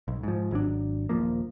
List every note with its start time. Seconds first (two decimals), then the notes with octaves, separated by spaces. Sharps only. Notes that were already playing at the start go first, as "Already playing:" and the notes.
0.08 B1
0.23 G#2 F3
0.51 G#1 F#3 D4
1.09 D#1 A#1 F3 A#3